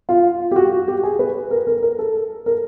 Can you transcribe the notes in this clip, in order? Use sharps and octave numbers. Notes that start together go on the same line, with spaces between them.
F4
G4
F#4
G4
G#4
B4
A#4
A#4
A#4
A4
A#4